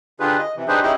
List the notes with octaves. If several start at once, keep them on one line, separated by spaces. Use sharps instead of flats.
D3 D4 F4 G4 G#4 B4
D#5
C3 E3
D4 D#4 G4 G#4 B4 C5
C#4 D#4 E4 G4 G#4 D#5